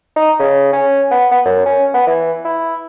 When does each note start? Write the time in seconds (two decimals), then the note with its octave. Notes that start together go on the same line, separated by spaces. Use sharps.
0.16 D#4
0.40 C#3
0.73 C#4
1.11 B3
1.32 B3
1.45 F#2
1.66 C#4
1.94 B3
2.07 E3
2.45 E4